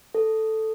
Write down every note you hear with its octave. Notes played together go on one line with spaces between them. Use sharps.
A4